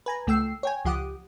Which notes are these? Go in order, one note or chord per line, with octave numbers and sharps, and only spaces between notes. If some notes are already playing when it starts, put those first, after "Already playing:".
B4 G#5 A#5
C#2 A3 G5 E6 C7
C#5 G5 G#5
C#2 F3 G4 F#5 D6 D#6